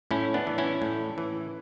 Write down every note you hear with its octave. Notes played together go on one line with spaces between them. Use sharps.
A2 C#4 E4
B3 D4
E3
C#4 E4
A2
E3